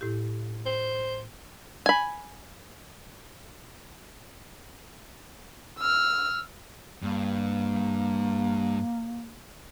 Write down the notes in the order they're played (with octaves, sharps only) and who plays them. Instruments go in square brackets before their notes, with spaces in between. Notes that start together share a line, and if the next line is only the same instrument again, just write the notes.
[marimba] A2 E4 G4
[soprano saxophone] C5
[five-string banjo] G#5 B5
[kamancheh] E6 F6
[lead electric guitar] G2 [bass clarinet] A#3